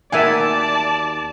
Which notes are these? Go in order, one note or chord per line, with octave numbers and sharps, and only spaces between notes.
D#2 F#4 A#4 D5 E5 F#5 G#5 A5